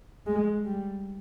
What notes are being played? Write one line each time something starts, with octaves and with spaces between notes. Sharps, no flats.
G#3
G3